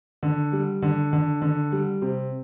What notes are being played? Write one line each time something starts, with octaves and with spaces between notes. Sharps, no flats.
D3
G3
D3
D3
D3
G3
C3